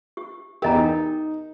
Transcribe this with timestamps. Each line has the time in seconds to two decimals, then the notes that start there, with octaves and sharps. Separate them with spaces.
0.17 G4
0.62 E2 G4 A#4 D#5 A#5
0.75 D#4